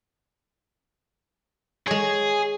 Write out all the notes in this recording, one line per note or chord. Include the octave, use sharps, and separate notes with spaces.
G#3 G#4 C#5